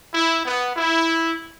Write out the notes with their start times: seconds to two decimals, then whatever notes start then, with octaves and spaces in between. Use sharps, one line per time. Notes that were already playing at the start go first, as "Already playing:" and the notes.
0.13 E4
0.44 B3
0.77 E4